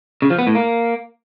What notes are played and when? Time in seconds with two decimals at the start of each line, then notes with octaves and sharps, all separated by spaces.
0.22 C#3
0.30 F3
0.39 B3
0.47 A2
0.55 A#3